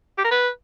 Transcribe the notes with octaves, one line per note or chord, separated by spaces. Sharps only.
G4
A#4
B4